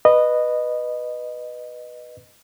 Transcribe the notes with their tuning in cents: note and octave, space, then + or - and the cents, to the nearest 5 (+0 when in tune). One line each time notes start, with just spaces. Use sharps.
B4 +0 D#5 -15